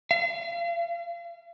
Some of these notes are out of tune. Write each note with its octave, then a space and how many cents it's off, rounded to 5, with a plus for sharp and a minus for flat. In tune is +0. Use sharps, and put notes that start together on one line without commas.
F5 -40